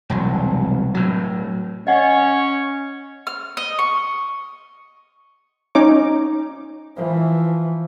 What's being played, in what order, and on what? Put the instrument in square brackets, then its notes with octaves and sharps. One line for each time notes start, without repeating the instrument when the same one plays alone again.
[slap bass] E1 C2 F#3
A2 F#3
[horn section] C#4 C#5 [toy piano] D#5 F#5
[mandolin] F6
D#5
C#6
[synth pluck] C#4 D#4 C#5 D6
[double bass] E3 F3